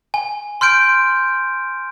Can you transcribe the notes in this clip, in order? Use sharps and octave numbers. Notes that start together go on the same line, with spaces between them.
G#5
C6 F6 G6 D7